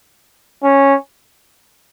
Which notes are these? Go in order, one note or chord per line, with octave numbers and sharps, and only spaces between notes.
C#4